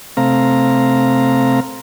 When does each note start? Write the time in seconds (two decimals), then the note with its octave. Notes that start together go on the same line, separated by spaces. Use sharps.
0.17 C3 A3 C4 F5 A#5